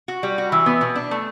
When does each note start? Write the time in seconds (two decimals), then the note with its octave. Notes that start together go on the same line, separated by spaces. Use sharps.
0.08 F#4
0.23 G3
0.38 F#4
0.52 E3
0.66 B3
0.81 B2
0.96 D4
1.11 A3